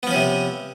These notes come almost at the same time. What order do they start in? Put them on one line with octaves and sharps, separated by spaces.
B3 F3 C#4 C3